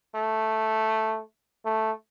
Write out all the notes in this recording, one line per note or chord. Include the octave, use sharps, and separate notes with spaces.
A3
A3